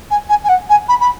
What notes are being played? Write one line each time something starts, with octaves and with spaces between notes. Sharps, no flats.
G#5
G#5
G#5
F#5
G#5
B5
B5